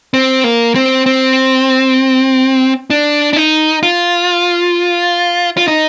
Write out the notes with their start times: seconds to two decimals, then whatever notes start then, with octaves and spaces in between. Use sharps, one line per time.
0.14 C4
0.44 A#3
0.75 C4
1.06 C4
2.90 D4
3.33 D4
3.36 D#4
3.83 F4
5.57 F4
5.68 D#4